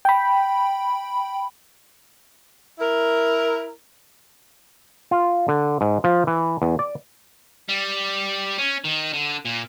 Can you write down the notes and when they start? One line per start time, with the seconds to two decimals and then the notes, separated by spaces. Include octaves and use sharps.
0.05 G5 B5
2.79 E4 A#4
5.11 F4
5.48 D3
5.81 G#2
6.04 F3
6.27 E3
6.62 E2
6.79 D5
7.69 G3
8.58 C#4
8.84 D#3
9.13 D3
9.45 A#2